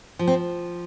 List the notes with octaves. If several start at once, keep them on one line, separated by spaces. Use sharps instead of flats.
F3
C4